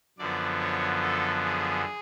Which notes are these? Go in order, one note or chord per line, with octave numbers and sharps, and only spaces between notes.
F#2 D3 F3 B3 D5
C#5
A4
G#4